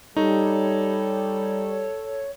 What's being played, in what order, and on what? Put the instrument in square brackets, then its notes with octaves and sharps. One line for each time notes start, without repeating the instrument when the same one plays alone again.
[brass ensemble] G3 [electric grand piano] D#4 [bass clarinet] A4 [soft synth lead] C#5